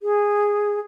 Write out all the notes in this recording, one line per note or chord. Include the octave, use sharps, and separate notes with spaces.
G#4